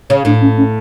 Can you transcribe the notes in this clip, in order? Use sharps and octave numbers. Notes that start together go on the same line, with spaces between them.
C#3 C#5
A2 D4
C#4
C#4